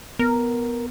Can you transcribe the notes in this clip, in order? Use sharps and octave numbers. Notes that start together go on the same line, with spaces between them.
B3 A#4